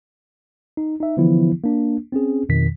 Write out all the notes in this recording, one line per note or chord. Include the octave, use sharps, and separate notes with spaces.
D#4
D#4 E5
D3 E3 F3 B3 E4
A#3 D4
C4 C#4 G#4
F2 B2 D#3 B6